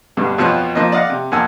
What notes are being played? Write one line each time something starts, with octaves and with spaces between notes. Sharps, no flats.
G2 B2 D3
F2 B2 F3 C4 C#5 F#6
F3 A#3 D#5
D5 D#5 F5 F#5
C3
F2 A#3 F#5 G#5 A5 E6